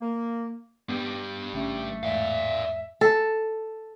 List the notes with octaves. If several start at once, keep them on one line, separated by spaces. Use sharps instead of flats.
A#3
G2 G3 B3
G#1 C#3 A3
E2 G#2 D5 E5 F5
A4